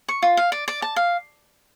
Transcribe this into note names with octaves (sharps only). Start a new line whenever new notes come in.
C#6
F4
F5
D5
D5
A5
F5